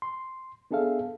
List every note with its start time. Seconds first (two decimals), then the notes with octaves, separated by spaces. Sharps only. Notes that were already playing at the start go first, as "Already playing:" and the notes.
0.02 C6
0.71 B3 D4 G#4 A4 E5 F5